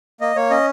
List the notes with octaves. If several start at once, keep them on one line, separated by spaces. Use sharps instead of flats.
A#3 D#5
A#3 C#5
C#4 D#5